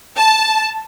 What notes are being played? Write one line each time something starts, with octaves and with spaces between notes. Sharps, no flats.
A5